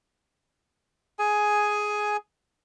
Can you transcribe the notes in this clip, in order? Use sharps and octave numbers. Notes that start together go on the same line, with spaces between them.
G#4 G#5